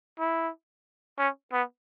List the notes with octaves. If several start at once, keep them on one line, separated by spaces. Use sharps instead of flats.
E4
C#4
B3